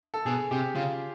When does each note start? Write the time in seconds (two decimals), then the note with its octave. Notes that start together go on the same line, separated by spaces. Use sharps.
0.14 A4
0.26 B2 G#4
0.51 C3 G4
0.75 C#3 F4